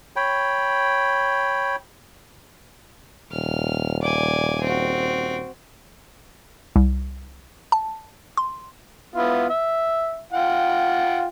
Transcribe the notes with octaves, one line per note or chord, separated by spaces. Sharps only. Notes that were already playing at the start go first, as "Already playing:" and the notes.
C#5 G5 B5
D#1 F6
D5 G#5
C4 F#4
C2
A5
C6
B3 E4 F4
E5
F4 F#5 G5